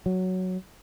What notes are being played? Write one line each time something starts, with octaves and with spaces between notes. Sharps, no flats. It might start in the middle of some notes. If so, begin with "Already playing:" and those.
F#3